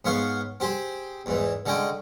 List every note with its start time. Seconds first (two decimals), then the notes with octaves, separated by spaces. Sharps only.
0.05 G#2 B3 C#5 F5 C6
0.60 C4 G4 G#4 C5
1.26 E2 G#2 E3
1.66 D3 G#3 C#4 D#5 G5